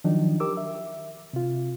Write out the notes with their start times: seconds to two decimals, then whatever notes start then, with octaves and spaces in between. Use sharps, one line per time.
0.04 D#3 F3 F#3 D4 D#4
0.40 G4 A#4 D6 E6
0.57 E5
1.33 C3 F4